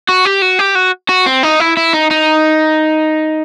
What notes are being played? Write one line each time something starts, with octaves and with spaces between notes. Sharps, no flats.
F#4
G4
F#4
G4
F#4
F#4
C4
D#4
E4
E4
D#4
D#4